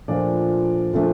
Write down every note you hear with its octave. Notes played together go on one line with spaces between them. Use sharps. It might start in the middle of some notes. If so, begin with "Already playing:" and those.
A#2 F3 A3 D4 D5
A#2 F3 A3 D4